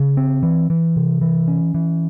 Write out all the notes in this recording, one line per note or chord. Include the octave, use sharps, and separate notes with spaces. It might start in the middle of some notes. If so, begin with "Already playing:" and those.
Already playing: C#3
C4
E3
E3
C3
E3
C#4
E3